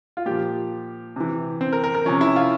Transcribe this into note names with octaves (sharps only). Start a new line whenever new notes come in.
F4
A#2 F3 G4
C3 E3
C4
A#4
A#4
A#4
C3 F3 C#4
E4
F4